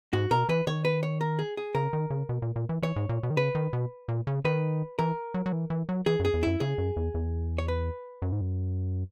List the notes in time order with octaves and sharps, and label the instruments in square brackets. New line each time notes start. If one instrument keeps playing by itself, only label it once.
[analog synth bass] G#2 [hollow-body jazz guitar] F#4
[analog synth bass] B2 [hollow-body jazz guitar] A#4
[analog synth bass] E3 [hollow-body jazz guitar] B4
[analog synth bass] D#3 [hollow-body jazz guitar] C#5
[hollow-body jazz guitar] B4
C#5
A#4
G#4
G#4
[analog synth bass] C#3 [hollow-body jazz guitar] A#4
[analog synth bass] D#3
C#3
B2
A#2
A#2
E3
[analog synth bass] E3 [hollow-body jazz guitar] C#5
[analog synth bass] G#2
A#2
B2
D#3
[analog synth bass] C#3 [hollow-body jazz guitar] B4
[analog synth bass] D#3
B2
A#2
C#3
[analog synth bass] D#3 [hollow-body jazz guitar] B4
[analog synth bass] E3 [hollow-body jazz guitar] A#4
[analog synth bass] F#3
F#3
E3
E3
F#3
[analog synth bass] E3 [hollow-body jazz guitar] G#4
[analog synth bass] F#2
[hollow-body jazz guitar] G#4
[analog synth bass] E2
[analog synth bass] F#2 [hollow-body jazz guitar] E4
[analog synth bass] C#3 [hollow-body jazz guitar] G#4
[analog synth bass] F#2
E2
E2
[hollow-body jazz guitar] C#5
B4
[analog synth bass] F#2
G#2
F#2